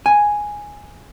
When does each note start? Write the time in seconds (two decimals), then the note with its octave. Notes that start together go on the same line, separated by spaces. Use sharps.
0.06 G#5